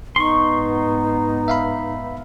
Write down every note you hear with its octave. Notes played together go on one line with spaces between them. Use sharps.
G#2 B3 D#4 C6 C#6
E5 F5 B5